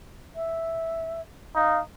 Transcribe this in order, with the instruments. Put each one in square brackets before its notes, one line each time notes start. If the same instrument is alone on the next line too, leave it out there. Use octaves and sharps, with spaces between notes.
[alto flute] E5
[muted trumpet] D#4 [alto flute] F5